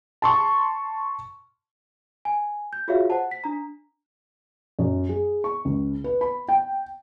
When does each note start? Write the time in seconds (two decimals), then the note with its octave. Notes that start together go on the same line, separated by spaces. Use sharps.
0.22 A5 C6 C#6
2.25 G#5
2.73 G6
2.88 F4 F#4 G#4 C#5 E5 F5
3.10 C5 F#5 A5
3.31 B6
3.44 D4 A#5
4.79 F#2
5.09 G#4
5.44 C#6
5.65 C#2
6.04 B4
6.21 B5
6.49 G5